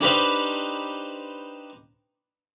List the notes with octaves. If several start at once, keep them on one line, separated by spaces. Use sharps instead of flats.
D4 D#4 G4 B4 C5 F5